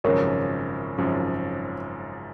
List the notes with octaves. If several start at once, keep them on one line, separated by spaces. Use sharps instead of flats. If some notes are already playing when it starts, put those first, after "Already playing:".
G#1 F#2 C#3 F3 A#4 C#5
G#1 F#2 C#3 F3